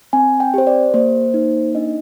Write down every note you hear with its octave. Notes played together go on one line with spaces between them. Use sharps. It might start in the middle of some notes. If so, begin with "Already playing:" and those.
C4 G#5
G5
G4 C5
D5
A#3 C5
D#4
D4 D#5